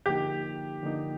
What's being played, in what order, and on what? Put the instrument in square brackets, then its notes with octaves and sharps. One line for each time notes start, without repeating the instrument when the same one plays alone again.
[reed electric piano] D3 F3 A#3 D#4 [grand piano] G4
[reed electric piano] D3 F3 A#3 D#4